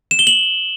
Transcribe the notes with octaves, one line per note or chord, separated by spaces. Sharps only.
E7
G7
F#7